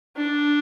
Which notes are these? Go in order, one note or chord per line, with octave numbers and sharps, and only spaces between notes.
D4